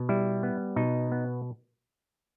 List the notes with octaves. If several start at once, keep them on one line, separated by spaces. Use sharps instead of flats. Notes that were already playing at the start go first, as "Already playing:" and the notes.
Already playing: B2
G3 E4
B3
B2 D#4
B3